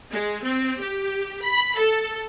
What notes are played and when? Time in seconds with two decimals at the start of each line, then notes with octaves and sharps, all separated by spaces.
0.11 G#3
0.44 C4
0.81 G4
1.44 B5
1.78 A4